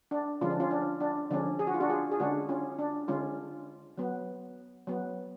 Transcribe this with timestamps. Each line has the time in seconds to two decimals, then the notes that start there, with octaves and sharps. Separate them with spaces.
0.11 D4
0.41 D3 F3 G#3 C#4 F4
0.50 D4
0.60 C#4 F4
0.71 D4
1.00 D4
1.31 D3 F3 G#3 C#4 D4
1.59 G#4
1.67 F#4
1.74 F4
1.80 D4 F#4
1.89 F4 G#4
2.12 G#4
2.20 D3 G#3 C#4 D4 F#4
2.49 C#4 F4
2.79 D4
3.08 D3 G#3 C#4 F4
3.98 F#3 B3
4.87 F#3 B3